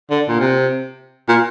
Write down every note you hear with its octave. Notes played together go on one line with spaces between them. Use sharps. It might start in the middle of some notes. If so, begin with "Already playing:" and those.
D3
A#2
C3
A#2